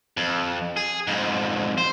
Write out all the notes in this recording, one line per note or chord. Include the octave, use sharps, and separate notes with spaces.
F2
G#4
F2 G#2
C5